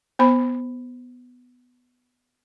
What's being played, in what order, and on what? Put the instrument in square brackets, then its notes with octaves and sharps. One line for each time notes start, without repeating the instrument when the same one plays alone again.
[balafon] B3 C5 B5